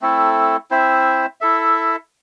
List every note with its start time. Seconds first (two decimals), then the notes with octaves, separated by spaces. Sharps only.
0.01 A3 C4 E4 A4
0.71 C4 E4 C5 E5
1.41 E4 A4 E5